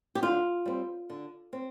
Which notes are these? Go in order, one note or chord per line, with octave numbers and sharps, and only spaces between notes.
G4
D3 F4
G3 C4
D3
C4